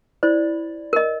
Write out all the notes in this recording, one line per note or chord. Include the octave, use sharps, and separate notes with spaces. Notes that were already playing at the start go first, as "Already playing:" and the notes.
E4 C5 D5
A#4 D#5